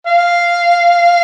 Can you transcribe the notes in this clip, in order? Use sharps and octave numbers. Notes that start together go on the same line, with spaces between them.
F5